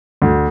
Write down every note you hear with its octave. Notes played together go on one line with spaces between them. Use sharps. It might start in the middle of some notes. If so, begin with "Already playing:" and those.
D2